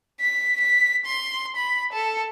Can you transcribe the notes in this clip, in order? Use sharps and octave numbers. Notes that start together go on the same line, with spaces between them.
B6
B6
C6
B5
A4